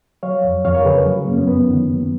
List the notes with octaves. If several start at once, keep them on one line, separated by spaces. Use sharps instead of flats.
F#3 C#5 F5
F2
F2 C#5 F5
A#4 C#5
C#3 G#4 B4
F#3
F#2 A#3 C#4
B3
F#2 B3
D#3
F#3